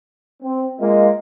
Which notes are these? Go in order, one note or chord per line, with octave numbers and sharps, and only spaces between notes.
C4
G#3 A#3 F4 D#5